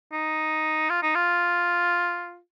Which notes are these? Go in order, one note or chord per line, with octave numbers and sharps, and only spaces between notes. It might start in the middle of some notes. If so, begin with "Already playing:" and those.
D#4
F4
D#4
F4